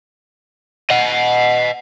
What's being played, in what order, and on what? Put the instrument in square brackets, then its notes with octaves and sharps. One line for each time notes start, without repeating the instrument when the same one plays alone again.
[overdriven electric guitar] D#5 F#5